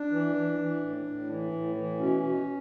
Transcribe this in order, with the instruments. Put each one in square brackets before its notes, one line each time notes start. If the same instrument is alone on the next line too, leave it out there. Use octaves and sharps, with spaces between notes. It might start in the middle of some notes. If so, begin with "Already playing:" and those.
Already playing: [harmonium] D4
E3
E3
E3
A2
A2
E3
A2
E3
B2 C#4
B2